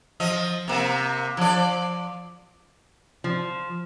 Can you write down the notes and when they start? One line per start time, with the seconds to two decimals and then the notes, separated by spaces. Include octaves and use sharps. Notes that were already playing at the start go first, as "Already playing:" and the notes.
0.20 F3 D#5
0.68 C3 A#3
1.37 F3 D5
3.24 F3